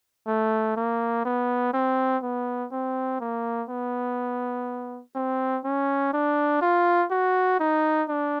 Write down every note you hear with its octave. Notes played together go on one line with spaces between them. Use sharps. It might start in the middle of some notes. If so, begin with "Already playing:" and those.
A3
A#3
B3
C4
B3
C4
A#3
B3
C4
C#4
D4
F4
F#4
D#4
D4